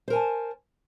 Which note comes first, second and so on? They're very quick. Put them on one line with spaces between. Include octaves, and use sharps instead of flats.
C5 A#4 G#5 A5